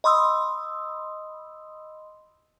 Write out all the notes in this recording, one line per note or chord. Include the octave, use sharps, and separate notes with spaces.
D#5 B5 C6 D#6 E6